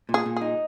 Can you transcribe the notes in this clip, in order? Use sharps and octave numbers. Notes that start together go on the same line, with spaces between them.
A#2
G#4
A#2
D#4 G#4